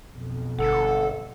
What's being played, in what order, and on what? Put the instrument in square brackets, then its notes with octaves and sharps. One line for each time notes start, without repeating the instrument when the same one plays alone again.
[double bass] B1 F2
[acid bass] G1 [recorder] A4 [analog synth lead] F#5